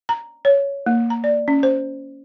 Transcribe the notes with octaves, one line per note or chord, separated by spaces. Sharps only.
A#5
C#5
A#3
A#5
D5
C#4
C5